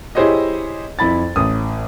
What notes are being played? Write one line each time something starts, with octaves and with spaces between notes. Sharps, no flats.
E4 G4 G#4 C5 C#5 D#5
F2 E4 B5 A6
A1 D#6